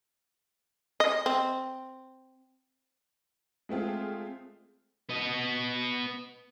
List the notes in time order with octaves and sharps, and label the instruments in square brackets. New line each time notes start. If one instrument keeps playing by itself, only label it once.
[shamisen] D#5
C4
[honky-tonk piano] G#3 A3 C4 F4 G#4
[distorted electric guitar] B3 D#5